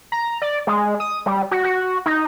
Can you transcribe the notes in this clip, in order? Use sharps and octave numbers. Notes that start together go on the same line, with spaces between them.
A#5
D5
G#3
D#6
G3
F#4
F#4
D#4